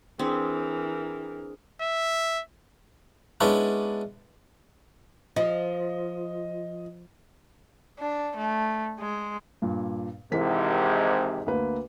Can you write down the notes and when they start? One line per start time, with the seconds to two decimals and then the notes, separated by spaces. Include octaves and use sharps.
0.19 E3 C4 D4 G#4 A#4 D#6
1.81 E5
3.41 G#3 B3 C#4 D4 E4
5.36 F3 D#5
7.99 D4
8.37 A3
8.99 G#3
9.62 G2 A#2
10.32 G#1 G#2 C3 E3 A#4 B6
11.46 D2 A#3 B4